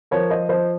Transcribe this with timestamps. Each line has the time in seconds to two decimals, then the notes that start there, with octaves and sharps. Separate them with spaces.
0.11 F3 A#4 C#5
0.30 F3 C5 D#5
0.49 F3 C5 D#5